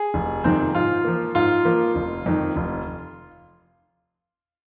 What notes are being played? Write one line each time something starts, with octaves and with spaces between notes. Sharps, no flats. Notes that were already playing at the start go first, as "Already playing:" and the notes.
Already playing: G#4
F1
F2 C3 D#3 C4
G#2 F4
F3 A#3
G#2 F4
F3 A#3
F1
F2 D#3
F1